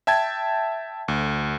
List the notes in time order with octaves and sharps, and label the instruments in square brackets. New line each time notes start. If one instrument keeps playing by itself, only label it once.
[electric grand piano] E5 G5 A5 G#6
D2